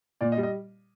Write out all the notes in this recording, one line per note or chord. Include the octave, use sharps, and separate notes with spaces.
A#2 D5
D#5
G3
D#5